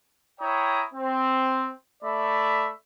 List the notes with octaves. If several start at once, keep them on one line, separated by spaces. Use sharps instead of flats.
E4 C#5 G5 A#5 D#6
C4
A3 D5 E5 B5